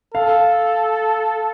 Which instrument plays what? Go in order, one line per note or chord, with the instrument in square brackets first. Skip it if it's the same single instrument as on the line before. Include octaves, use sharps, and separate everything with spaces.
[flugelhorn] A4 [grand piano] F5